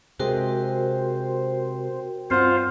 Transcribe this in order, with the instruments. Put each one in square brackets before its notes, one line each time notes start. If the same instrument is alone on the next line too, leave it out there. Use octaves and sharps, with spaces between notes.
[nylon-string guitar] C3 G#3 G#4 [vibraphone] F#4 A#4 G5 [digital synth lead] C5
[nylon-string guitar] G2 C#4 F#5 [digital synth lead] C4 [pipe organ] F4 C5 F5